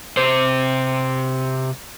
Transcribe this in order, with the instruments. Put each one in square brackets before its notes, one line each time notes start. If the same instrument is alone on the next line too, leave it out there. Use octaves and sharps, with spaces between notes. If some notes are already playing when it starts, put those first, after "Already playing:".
[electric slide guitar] C3 C5